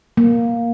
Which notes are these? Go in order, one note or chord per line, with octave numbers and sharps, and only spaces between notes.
A#3